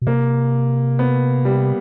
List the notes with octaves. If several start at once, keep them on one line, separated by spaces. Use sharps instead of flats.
B2
C3 A#3
B3
G3